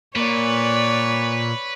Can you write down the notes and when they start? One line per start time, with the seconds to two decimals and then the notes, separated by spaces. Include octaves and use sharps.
0.16 A#2 B4 C#5 D5